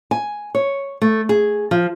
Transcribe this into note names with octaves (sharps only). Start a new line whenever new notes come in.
G#5
C#5
A3
G#4
F3